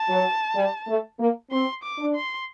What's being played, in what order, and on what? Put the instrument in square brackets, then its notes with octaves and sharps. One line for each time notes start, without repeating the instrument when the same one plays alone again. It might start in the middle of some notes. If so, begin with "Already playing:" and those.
Already playing: [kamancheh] A5
[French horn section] F#3
G3
A3
A#3
[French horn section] C4 [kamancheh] C6
[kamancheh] D6
[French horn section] D4
[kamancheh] C6